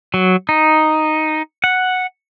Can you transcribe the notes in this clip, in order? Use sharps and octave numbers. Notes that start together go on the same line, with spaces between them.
F#3
D#4
F#5